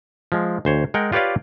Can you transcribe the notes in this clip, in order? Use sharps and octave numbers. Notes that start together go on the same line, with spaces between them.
F3 G#3
D2 C5 C#5
G#3 A#4 F#5 G5
F4 G4 B4 C#5 D5 F5